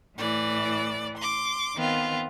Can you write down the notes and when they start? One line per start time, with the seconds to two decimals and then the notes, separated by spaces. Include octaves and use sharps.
0.17 A2 E3 D5
1.17 C6 D6
1.77 D#3 B3 C4 F4